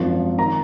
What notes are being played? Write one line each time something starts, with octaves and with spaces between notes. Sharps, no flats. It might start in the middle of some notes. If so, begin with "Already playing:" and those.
Already playing: G#1 F#2 F3
D#3 A#5